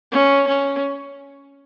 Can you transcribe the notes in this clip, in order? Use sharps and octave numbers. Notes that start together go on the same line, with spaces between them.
C#4
C#4